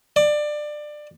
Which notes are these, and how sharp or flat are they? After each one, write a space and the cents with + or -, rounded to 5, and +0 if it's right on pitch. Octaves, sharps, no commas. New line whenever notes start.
D5 +20